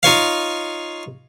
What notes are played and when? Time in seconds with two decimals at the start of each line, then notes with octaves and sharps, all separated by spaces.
0.03 D#4 F4 C#5 F5